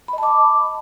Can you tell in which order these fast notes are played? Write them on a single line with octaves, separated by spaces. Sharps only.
B5 D#5 A5 D6